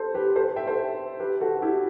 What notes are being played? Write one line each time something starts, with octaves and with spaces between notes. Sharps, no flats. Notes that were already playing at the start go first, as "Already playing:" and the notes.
Already playing: A4 C5
G4 B4
A4 C5
E5 G5
A4 C5
G4 B4
F#4 A4
E4 G4